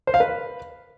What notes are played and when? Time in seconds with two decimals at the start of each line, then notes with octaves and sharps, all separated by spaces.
0.07 C5
0.14 F5
0.20 B4